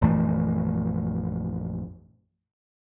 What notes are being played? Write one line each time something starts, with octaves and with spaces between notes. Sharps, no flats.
A#1 F#2 E3 A3